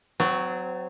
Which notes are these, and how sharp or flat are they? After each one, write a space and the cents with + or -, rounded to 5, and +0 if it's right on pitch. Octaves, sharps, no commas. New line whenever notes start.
F#3 +0 C4 -35